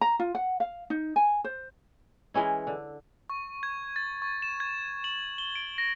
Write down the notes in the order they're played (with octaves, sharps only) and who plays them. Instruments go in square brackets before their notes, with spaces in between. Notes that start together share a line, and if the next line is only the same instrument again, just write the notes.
[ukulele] A#5
F4
F#5
F5
D#4
G#5
C5
[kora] E3 G#3 C#4 E4
D3
[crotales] C#6
G#6
A6
C#6
E7
G#6
F#7
G7
D7
A#6